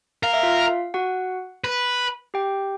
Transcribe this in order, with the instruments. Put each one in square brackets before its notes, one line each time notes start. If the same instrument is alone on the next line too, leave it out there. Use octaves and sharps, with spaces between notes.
[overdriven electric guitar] A#4 [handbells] F5
[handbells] E5
F4 F5
F#4 F#5
[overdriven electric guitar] B4
[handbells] G4 G5